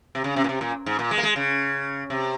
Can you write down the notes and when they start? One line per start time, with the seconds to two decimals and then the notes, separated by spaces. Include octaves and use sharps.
0.15 C3
0.24 C#3
0.36 C3
0.44 A#2
0.49 C3
0.61 A#2
0.86 G#2
0.99 A#2
1.11 G#3
1.18 A#3
1.23 G#3
1.36 C#3
2.10 C3